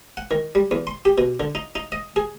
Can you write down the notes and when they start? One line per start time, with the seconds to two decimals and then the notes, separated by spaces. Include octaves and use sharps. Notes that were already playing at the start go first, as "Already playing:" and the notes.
0.17 F#5
0.31 D#3
0.55 G3
0.71 E2
0.87 C6
1.05 G4
1.18 B2
1.40 D3
1.55 D#4
1.75 D#4
1.92 D#5
2.16 G#4